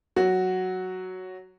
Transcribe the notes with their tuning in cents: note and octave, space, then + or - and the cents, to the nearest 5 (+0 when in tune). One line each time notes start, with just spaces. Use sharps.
F#3 +0 F#4 +0